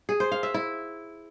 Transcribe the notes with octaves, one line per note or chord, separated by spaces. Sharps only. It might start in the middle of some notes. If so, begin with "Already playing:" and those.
G#4
C5
F5
E5
E4